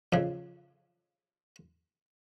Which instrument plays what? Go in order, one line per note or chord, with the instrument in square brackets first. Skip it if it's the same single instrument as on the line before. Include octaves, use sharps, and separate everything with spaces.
[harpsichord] F2 C#3